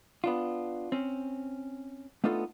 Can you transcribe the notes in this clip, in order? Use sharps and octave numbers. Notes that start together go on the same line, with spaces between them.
B3 D4 F4
C4 C#4
A3 B3 D4 D#4 F4 A4